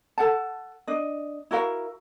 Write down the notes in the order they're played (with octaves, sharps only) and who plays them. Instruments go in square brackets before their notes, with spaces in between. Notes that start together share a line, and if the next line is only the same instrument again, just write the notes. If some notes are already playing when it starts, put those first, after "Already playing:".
[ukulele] A4 F#5 A5
D4 D#5
E4 F#4 A#4 F5